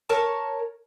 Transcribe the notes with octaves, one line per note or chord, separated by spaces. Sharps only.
A#4 C#5 A5